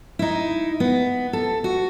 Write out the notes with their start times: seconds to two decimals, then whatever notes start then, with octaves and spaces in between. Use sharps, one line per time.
0.19 D#4 E4
0.80 B3
1.33 A4
1.64 F#4